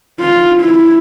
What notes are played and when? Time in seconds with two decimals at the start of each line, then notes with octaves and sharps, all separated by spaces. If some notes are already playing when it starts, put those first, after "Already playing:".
0.20 F4
0.61 E4